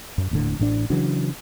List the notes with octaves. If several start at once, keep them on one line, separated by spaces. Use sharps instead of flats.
F#2
D#1 A2 D3
A1 A2 C#4 D4
C#3 E3 F#3 D4